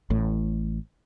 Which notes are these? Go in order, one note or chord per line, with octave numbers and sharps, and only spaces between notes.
A1 A2